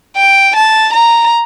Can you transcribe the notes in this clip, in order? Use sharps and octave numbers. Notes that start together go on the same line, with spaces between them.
G5
A5
A#5